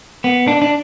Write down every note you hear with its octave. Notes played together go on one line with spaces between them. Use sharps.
B3
D4
D4